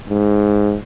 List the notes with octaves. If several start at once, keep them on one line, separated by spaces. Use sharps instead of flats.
G#2